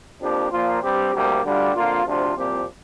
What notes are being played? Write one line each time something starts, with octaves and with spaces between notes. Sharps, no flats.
F2 F3 A#3 D4 G4
A#2 F3 A#3 F4
G2 G3 C4 G4
D2 C3 G3 A#3 G4
D2 D3 G3 D4 F4
F2 D3 A#3 F4
D2 C3 F3 D4 F4
C2 A#2 F3 C4 G4